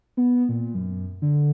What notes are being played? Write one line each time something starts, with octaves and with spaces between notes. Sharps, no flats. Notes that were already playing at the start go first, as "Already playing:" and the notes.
B3
A#2
F#2
D3